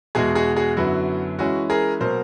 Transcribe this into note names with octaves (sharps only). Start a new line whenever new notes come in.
E2 B2 G#3 F#4 G#4
F#4 G#4
F#4 G#4
F#2 D3 F#3 B3 E4 F#4
E3 G#3 C#4 E4 F#4
G#4 A#4
B2 F#3 A#3 A#4 C5